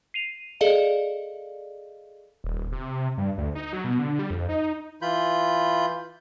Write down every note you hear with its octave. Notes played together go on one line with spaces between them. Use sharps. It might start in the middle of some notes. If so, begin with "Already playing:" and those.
C7 D#7 F7
G#4 A4 D5 D#5 F5
D#1
C3
G2
D2
D#4
F#3
B2
D3
G3
F2
D#4
E3 F4 B5 G6